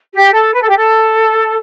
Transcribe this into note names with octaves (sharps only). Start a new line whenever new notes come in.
G4
A4
B4
A4
G4
A4